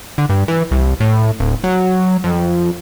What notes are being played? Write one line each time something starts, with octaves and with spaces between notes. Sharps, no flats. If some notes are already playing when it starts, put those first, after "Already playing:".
D3
G2
E3
C2
A2
D1
F#3
F2